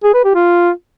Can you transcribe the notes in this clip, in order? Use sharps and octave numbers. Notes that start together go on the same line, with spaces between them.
G#4
B4
G4
F4